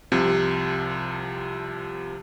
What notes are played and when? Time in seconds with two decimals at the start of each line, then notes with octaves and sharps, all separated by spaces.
0.12 C2 C3 F3